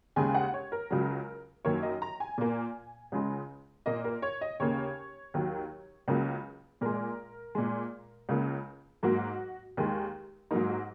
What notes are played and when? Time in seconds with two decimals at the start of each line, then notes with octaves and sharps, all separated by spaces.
0.16 D#2 C#3 G#3 G#5
0.34 F#5
0.54 C#5
0.72 A#4
0.90 C#2 C#3 F#3
1.65 F#2 D#3 A#3 C#5
1.83 D#5
2.02 A#5
2.20 G#5
2.38 A#2 A#3
3.12 C#2 C#3 G#3
3.86 A#2 A#3 D#5
4.04 A#4
4.22 C#5
4.41 D#5
4.60 D#2 C#3 A#3 C#5
5.34 D#2 D#3 F#3
6.08 C#2 C#3 F#3 A#3
6.81 A#2 G#3 A#4
7.55 A#2 G#3
8.29 C#2 C#3 A#3
9.03 G#2 F#3 A#3 F#4
9.77 D#2 D#3 G#3
10.51 G#2 F#3 A#3 D#4
10.69 F#4